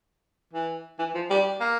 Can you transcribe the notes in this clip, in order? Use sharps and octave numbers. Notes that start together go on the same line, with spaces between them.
E3
E3
F3
G3
A#3